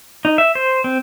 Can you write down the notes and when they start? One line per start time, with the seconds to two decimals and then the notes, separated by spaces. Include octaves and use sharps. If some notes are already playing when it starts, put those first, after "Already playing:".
0.25 D#4
0.38 E5
0.55 C5
0.84 C4